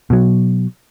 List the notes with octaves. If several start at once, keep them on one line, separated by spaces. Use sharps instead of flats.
B2 F#3